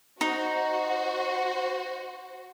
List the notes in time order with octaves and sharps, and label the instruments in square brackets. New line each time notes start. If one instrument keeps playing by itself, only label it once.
[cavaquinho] D#4 [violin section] F#4 C5